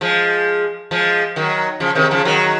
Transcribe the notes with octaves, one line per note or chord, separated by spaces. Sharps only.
F3 G#3
F3 G#3
D#3 F#3
C#3 F3
C3 D#3
C#3 F3
D#3 F#3